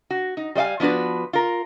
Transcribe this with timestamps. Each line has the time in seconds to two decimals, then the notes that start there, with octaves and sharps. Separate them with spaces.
0.10 F#4
0.37 D#4
0.55 G3 C5 D#5 F5 G#5
0.80 F3 B3 D4 F#4 B4
1.33 F4 A#4